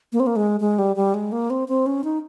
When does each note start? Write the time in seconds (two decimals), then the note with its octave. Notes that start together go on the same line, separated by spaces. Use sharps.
0.12 A#3
0.20 C4
0.27 A#3
0.36 G#3
0.60 G#3
0.79 G3
0.96 G3
1.14 G#3
1.32 A#3
1.50 C4
1.68 C4
1.86 C#4
2.04 D#4